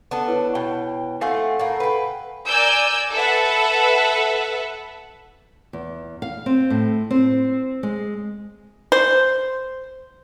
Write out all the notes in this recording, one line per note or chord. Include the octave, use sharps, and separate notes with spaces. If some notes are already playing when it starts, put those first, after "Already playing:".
B3 D4 A4
E4 B4 C#5
B2 G5
A3 C4 F4 A4 F5 F#5 G#5
A2 A#3
B4 G5
A#4 D5 G#5 E6 G6
A4 B4 E5 F#5
E2
F5
C4
A2
C4
G#3
C5